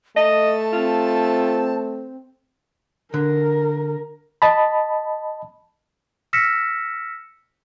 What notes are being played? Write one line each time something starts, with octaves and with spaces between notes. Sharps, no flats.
A3 D#5 A5
C4 F4
D3 A#4
D#5 A5 B5
E6 F6 A#6 B6 C#7 E7